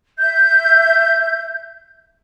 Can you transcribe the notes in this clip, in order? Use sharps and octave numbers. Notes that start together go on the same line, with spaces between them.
E5 G6